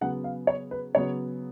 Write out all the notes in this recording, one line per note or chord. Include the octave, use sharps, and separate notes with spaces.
C#3 F#3 B3 F#5
F5
C#5
B4
C#3 F#3 B3 C#5